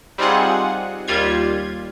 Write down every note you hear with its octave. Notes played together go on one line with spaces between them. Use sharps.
G3 C4 D#4 F4 G#4 F#5
D#2 G3 F4 G#6